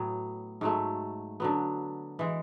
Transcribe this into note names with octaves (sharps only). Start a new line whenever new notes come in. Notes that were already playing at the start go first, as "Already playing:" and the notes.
Already playing: A2 F#3 B3
G#2 F#3 A3
D3 F#3 B3
E3 G#3